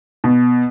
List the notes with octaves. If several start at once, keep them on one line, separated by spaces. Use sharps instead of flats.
B2